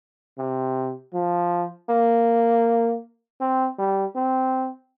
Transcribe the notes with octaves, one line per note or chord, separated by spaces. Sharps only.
C3
F3
A#3
C4
G3
C4